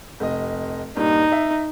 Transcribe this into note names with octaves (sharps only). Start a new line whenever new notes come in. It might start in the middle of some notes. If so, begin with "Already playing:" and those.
F1 D#5
G2 A#2 D#4
E5